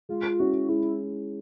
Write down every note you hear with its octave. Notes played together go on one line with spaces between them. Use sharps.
G#3 F4
C#4 E4 F#4
G#3 E4